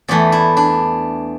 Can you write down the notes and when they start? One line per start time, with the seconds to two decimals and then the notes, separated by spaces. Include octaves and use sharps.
0.08 E2 E3 A3 D5
0.32 E4
0.57 D4